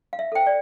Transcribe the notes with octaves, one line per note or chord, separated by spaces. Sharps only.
F5
E5
A4 C5 G5
D5